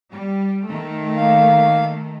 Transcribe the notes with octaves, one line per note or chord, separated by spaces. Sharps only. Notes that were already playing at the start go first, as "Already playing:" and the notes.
G3
D#3 A3
A#3 F5